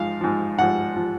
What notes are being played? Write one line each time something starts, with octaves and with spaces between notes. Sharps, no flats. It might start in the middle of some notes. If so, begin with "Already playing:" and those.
Already playing: G#2 F3 F5
G#2 F3
G#2 F3 F#5
F3